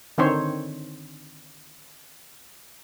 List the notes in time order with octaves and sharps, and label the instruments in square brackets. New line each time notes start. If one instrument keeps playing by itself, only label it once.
[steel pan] D3 D#3 C4 C5 C#5